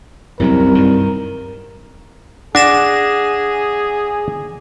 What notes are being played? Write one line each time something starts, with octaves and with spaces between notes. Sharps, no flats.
C2 F#2 C3 F#3 A#4
G2 D#3
D4 G#4 F#5 D6 A#6 E7